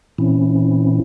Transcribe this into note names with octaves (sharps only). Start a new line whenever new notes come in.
A#2 E3 C4 C#4 E4